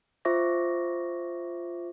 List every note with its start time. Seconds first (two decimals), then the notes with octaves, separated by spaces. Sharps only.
0.25 F4 C5 E5 C#6 D6 A#6